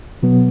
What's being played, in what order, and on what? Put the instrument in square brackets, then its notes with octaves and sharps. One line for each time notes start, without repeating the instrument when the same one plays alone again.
[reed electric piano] B2 F#3 B3